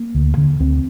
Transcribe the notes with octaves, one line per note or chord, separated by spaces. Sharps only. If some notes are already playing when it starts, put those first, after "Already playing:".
Already playing: A#3
D2
D3
D2 C4